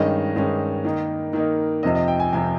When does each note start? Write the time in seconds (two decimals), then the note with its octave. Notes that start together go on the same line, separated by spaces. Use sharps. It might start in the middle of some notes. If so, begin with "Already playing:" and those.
Already playing: G2 D#3 G#3 C#4 D#5
0.36 G2 D#3 G#3 C#4
0.85 D#3 A#3 D#4
1.33 D#3 A#3 D#4
1.83 F2 C3 F3 D#5
1.95 D#5
2.08 G5
2.20 G#5
2.33 F2 C3 F3 G#5